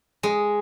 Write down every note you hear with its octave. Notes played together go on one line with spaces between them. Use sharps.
G#3